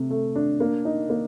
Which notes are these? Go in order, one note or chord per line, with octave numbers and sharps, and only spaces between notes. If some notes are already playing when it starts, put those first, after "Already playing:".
Already playing: C3 A3
A3
D4
A#3
D#4
A#3